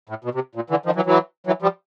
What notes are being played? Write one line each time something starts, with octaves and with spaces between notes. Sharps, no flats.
A2
B2
C3
A#2
D3 E3
D#3 F3
E3 F#3
E3 F#3
E3 F#3
F3 G3